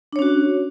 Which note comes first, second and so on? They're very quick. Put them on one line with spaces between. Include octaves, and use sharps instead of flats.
D4 C#5 C#4 F#4